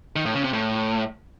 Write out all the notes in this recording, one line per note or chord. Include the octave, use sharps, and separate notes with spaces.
D#3
A2
C#3
C3
A2